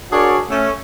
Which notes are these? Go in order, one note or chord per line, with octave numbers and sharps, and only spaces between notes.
D4 F#4 G#4 A#4 C#5 D5
A3 C#4